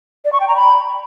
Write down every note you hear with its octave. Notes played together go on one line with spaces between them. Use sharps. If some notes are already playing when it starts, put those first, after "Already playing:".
D5
C#6
G5
A#5
B5